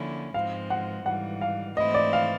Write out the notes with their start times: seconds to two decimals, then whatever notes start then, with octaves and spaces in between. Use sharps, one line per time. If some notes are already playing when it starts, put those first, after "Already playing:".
Already playing: D3 F3 A#3 C#4 E4
0.34 G#2 F3 G#3 C4 F5
0.70 F#5
1.05 G#2 E3 G3 F#5
1.41 F5
1.77 G#2 E3 A3 C4 E4 D#5
1.94 D5
2.13 F5